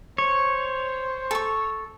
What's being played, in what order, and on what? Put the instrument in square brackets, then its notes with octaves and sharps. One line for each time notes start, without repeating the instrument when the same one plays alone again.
[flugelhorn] C5 [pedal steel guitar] C#5
[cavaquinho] A4 C#6